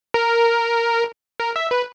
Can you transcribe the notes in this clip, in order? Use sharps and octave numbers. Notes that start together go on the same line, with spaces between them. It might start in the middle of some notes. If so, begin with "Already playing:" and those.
A#4
A#4
E5
B4